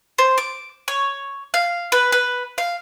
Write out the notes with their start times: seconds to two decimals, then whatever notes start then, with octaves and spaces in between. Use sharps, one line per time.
0.18 C5
0.38 D6
0.88 C#5
1.54 F5
1.92 B4
2.12 B4
2.58 F5